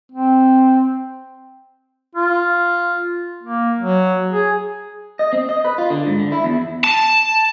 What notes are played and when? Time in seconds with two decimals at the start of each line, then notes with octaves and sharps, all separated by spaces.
0.12 C4
2.15 F4
3.43 A#3
3.79 F#3
4.31 G#4
5.19 D#5
5.33 C4
5.49 D#5
5.65 B4
5.78 F4
5.90 D3
6.07 G#2
6.20 D3
6.32 E4
6.44 E2
6.84 A5